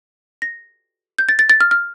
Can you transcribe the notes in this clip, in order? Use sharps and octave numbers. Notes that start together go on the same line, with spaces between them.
A#6
G6
A6
A6
A6
F6
F6